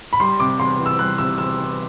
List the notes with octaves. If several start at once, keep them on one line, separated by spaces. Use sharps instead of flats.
B5
G3 C6
C3 D6
E2 C6
E3
E6
G3 F#6
C3 E6
E2 E6
E3